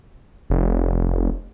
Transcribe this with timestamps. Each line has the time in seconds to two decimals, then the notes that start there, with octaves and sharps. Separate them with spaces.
0.50 F1